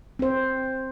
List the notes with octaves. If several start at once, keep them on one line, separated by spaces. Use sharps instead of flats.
C4 C5